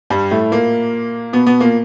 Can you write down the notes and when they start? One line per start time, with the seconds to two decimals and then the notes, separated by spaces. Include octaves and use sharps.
0.10 G2 G3
0.31 A2 A3
0.52 A#2 A#3
1.33 B2 B3
1.47 B2 B3
1.60 A#2 A#3